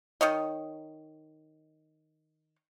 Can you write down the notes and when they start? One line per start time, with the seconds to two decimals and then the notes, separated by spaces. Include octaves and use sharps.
0.21 D#3 C#5 D#5